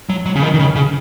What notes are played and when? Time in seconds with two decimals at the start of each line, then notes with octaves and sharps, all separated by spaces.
0.09 F#3
0.26 F#3
0.36 C#3
0.42 D#3
0.54 D#3
0.59 C#3
0.76 C#3